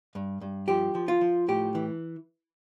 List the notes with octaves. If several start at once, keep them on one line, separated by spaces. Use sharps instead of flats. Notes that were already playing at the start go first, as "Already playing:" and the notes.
G2
G2
F3 G4
F3
F4
F3
A2 G4
E3